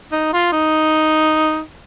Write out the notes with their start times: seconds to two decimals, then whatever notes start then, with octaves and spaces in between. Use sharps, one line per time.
0.12 D#4
0.33 F4
0.52 D#4